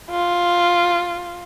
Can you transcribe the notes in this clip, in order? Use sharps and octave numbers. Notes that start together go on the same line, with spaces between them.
F4